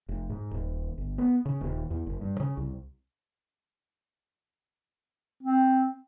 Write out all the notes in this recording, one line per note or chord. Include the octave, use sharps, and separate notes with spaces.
F1
G#2
D#1
G1
B3
C#3
D#1
E2
F#1
G2
C#3
C2
C4